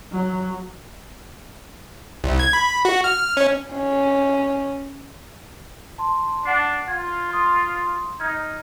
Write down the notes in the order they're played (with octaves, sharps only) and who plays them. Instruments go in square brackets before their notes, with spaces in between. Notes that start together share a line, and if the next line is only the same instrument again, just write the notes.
[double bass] F#3
[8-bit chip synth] C2
G#6
B5
F#4
F6
C#4
[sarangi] C#4
[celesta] A5 C6
[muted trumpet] D4 [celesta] F#5 C7
[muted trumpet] F4 [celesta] G#6
[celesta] C6 D#6
[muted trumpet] D#4 [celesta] F6 G#6